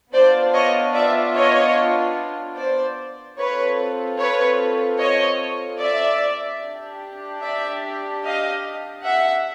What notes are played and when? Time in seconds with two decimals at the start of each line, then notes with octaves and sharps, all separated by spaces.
0.12 B3 D4 F4 C5 D5
0.54 C#5 D#5
0.94 D5 E5
1.34 C#5 D#5
2.56 C5 D5
3.38 C4 F4 A4 B4 C#5
4.19 B4 C#5
5.00 C#5 D#5
5.81 D5 E5
6.62 D4 G4
7.42 D5 E5
8.24 D#5 F5
9.05 E5 F#5